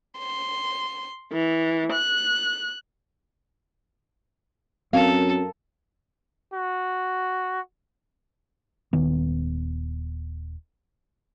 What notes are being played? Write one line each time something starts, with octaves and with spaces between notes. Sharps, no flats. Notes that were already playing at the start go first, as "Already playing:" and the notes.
C6
E3
F#6
F#2 C4 A4 A#4 F5
F#4
D#1 D#3 B3